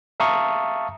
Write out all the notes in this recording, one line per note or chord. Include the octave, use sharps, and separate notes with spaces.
E5 F5 A5 A#5 C#6 D#6